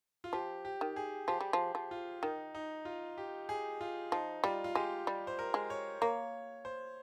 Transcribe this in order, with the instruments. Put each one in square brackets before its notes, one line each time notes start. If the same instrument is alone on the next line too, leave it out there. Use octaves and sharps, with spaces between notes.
[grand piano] F4
[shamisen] F3 [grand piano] G4
[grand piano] G4
[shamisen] D#3
[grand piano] G#4
[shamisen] F3 [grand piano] G4
[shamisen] G3
F3
F3
[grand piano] F4
[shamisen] D#3 [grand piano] D#4
[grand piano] D#4
F4
G4
G#4
F4
[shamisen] F3 [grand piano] D#4
[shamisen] G3 [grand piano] F4
[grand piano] F4
[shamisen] G#3 [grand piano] G4
[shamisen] G3
[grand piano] C5
A#4
[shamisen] G#3
[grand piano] C#5
[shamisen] A#3 [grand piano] C#5
[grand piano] C5